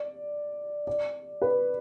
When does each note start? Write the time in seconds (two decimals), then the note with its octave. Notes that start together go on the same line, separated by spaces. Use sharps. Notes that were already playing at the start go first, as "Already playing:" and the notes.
Already playing: D5
0.87 D5
1.42 B4